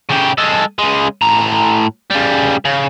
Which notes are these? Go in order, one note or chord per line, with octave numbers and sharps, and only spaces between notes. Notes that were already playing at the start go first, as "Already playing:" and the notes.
C#3 G4
G#3 A4
C#3 G#3
A2 A#5
C#3 G3
C#3